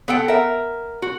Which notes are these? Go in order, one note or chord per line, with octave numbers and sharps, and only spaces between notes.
B3 A4 F#5 G5
A#4 E5
F#4